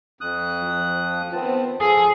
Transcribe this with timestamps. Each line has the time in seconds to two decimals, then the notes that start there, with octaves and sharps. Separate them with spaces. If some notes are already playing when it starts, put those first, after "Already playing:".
0.21 F2 D#6 F#6
0.62 F3
1.33 D#3 B3 C4 A5
1.80 F3 G#4 A4